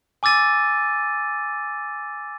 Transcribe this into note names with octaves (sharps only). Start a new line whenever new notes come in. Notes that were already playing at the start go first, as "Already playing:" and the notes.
G#5 D6 E6 A6 D#7